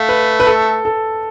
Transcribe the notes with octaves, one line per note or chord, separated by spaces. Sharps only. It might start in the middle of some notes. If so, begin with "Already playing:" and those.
Already playing: A3 F5
B4
B4
A4
A4